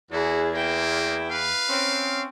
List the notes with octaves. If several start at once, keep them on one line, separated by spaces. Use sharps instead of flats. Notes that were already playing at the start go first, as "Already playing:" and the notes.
E2 E4 F#4 G#4
A#3 E4 G5
B4 F5
C4 C#4